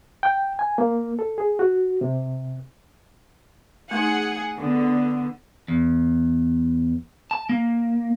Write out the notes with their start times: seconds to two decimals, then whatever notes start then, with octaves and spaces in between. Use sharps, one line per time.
0.23 G5
0.59 G#5
0.78 A#3
1.19 A4
1.38 G#4
1.59 F#4
2.01 C3
3.91 A3 D#4 G#4 F#5 G#5
4.58 D3 B3
5.68 E2
7.31 A5
7.49 A#3